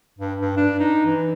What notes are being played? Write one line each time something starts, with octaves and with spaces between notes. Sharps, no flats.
G2
G2
D4
D#4
E3